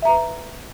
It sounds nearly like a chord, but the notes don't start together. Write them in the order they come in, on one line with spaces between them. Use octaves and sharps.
E5 A#5 B4